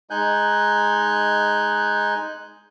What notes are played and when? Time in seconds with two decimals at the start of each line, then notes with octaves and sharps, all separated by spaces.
0.10 G#3 D#4 G#5 F#6 G6